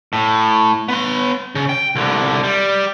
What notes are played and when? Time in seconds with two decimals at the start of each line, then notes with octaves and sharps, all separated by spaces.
0.13 A2
0.88 B3 C6
1.55 C#3
1.69 G5
1.95 C2 D3
2.43 G3